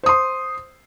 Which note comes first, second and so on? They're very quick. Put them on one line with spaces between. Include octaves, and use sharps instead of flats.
C5 D#6 C6